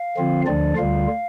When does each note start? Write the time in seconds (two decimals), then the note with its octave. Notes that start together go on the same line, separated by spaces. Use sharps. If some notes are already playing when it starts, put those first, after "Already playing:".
Already playing: F5
0.17 D3 F3 C4 F4
0.46 D2 D3 F3 D4 D5
0.77 D2 D3 G3 F4 F5